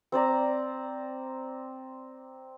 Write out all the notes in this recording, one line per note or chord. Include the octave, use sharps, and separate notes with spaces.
C4 C5 D5 A#5